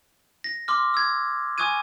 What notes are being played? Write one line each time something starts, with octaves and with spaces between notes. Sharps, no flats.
A#6
C6 D6 F6
E6 G#6
G#5 C#6 D#6 F#6 G#6 D#7